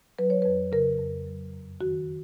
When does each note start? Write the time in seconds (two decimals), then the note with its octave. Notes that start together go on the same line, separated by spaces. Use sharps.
0.19 F#3 B4
0.30 C#5
0.42 F2 B4
0.72 C#3 A#4
0.99 F2
1.26 F#3
1.54 F#2
1.81 D#3 F#4